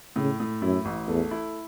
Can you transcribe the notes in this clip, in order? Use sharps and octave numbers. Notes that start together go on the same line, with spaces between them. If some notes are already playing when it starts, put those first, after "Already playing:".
A2 C#3
A2
F#2 E4
A1
E2 A3
E4